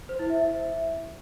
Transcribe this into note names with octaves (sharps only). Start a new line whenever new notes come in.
C5
E4
E5